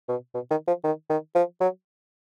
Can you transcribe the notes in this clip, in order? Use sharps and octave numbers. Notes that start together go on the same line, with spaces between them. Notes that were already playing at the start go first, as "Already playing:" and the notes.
B2
B2
D#3
F3
D#3
D#3
F3
F#3